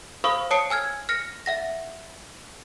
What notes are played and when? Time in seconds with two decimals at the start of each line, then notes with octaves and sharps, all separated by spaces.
0.24 C5 F5 B5 C#6 D#6 E6
0.51 C#5 A5 D#6 C7 C#7
0.70 G#5 E6 F6 G#6
1.09 F6 A#6 C#7
1.46 E5 F#5 A#6